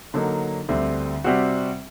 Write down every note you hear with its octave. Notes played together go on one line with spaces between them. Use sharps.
D3 F#3 A#3 D#4
D2 D3 G3 C4
C3 G3 C4 F#4